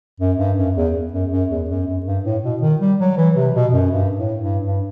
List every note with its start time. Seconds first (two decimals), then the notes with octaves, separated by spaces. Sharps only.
0.20 F#2
0.38 G2
0.57 F#2
0.76 E2
1.13 F#2
1.31 F#2
1.50 E2
1.69 F#2
1.87 F#2
2.06 G2
2.24 A2
2.43 B2
2.61 D#3
2.80 G3
2.99 F#3
3.17 E3
3.36 C3
3.54 B2
3.73 F#2
3.91 G2
4.17 A2
4.41 G2
4.66 G2